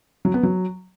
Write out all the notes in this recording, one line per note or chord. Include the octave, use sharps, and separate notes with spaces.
F#3
B3
F#3